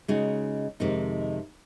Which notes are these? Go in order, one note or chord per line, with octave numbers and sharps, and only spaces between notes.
C#3 G#3 D#4 F#4
F2 C3 D#3 G#3 D#4